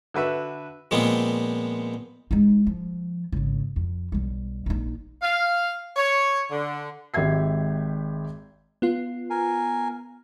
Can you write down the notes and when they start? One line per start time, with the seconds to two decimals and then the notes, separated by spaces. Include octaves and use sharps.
0.14 D3 F#4 B4 E5
0.91 A#2 F3 G#3 B3 C4
2.31 G#3 D#4
2.67 F3
3.32 G#1 C#3
3.76 F2
4.12 B1 G3
4.66 A#1 D#4
5.22 F5
5.97 C#5
6.51 D3
7.14 G#1 G#2 G4 E5 G#6 C7
8.82 B3 F4
9.30 A#4 G#5